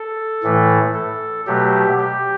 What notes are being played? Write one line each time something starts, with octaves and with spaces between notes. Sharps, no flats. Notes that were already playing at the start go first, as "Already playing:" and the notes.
Already playing: A4
A2 E3 A3
A4
B2 F#3 A3 G4
G4